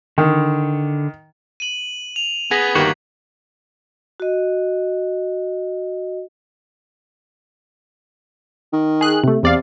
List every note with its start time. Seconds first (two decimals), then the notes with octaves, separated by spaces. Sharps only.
0.18 D3 D#3
1.60 D#7 F#7
2.16 F7
2.51 B3 G#4 G#6 A#6 B6
2.75 G1 D#3 A#3 F#4 G4
4.20 F#4 D#5
8.73 D#3
9.01 G#4 F#6
9.24 C3 A3
9.43 E2 C3 D5 F5